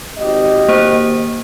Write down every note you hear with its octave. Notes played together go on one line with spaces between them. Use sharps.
G#1 G4 D#5
A#3 C5